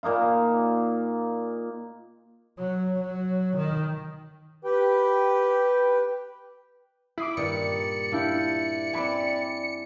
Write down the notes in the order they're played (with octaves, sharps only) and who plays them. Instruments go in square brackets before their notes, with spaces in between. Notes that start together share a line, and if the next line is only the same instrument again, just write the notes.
[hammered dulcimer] A#2 A#3 D#4 F4
[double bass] F#3
F#3
D#3
[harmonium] G4 B4 G5
[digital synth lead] E4 [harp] D6 D#6 C7
[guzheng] G2 A#2 D#3 [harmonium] D5 [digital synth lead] C#7
[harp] D4 E4 G4 [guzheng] F4
[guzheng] C4 D4 [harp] G#5 B5 D6